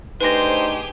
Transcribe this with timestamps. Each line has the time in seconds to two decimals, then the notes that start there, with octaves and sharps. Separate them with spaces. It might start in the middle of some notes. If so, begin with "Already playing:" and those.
0.21 A3 D4 D#4 G4 G#4 B4 C5 A#6